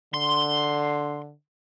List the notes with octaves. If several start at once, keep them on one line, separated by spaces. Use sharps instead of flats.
D3 C6